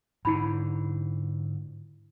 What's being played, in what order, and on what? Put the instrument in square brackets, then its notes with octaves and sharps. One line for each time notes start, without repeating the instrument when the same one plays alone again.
[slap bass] G#2 D3 [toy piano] E4 B5